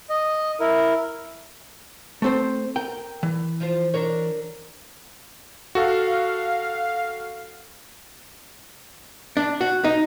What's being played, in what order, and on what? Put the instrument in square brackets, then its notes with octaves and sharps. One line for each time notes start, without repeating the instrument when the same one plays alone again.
[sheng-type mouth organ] D#5
E4 A#4
[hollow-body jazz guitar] A3 C4 C5
[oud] A#4 [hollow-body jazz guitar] G5
[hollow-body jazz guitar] E3
[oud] F3 F4 C5
D4 A#4 C#5
[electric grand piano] F#4 A4 [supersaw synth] F5
[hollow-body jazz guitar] D4
F#4
D#4